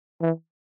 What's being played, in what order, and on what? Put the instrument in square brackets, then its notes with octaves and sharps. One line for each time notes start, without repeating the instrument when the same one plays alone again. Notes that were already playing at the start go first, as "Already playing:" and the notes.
[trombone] E3